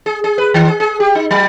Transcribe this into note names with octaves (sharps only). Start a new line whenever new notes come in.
G#4
G#4
B4
D#3
G#4
G#4
G4
D#4
F#3